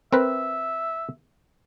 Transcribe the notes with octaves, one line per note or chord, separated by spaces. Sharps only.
C4 A#4 B4 E5